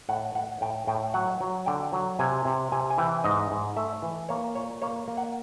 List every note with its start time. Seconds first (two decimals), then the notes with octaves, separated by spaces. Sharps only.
0.09 A2 F#5
0.35 A2 F#5
0.61 A2 G5
0.87 A2 G5
1.14 F#3 F#5
1.41 F#3
1.66 D3 G5
1.92 F#3
2.19 C3 G#5
2.45 C3
2.72 C3 G#5
2.90 G#5
2.98 E3 G5
3.24 G#2 D#5
3.51 G#2
3.76 A3 E5
4.03 E3
4.29 A#3 C#5
4.55 A#2 C#5
4.82 A#3 C#5
5.08 A#3
5.17 F#5